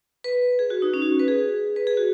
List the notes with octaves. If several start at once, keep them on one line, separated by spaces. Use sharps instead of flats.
B4
G#4
F#4
D#4
C#4
F#4
B4
G#4
B4
G#4
F#4